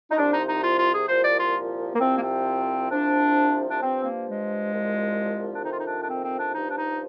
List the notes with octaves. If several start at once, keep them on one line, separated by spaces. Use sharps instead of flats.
D#4
C2 C3 F3 D4
D#4
D#4
F4
F4
G#4
C2 A#2 F3 C5
D5
F4
A#3
C2 C3 F3 C4
A#3
C4
C2 C3 F3 D4
D4
G2 F3 C4
A#3
G#3
C2 A#2 F3
D4
F2 C3 D#3 D#4
F4
D#4
D4
D4
C4
C4
D4
G2 F3 D#4
D4
D#4